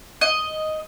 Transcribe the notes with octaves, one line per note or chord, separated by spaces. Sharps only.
D#5